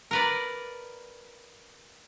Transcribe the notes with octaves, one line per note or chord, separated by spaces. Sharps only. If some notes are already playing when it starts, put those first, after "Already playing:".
A#4 B4 D5